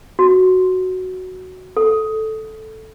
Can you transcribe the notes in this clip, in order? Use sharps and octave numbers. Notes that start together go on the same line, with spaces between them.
F#4
A4